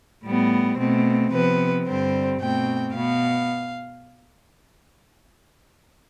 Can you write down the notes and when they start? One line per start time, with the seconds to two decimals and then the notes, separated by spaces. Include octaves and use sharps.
0.24 A2 G3 B3
0.78 B2 A3 C4
1.32 C3 F3 B3 B4
1.87 G2 D3 G3 C4 C5
2.41 B2 A3 C4 G5
2.95 B2 B3 F5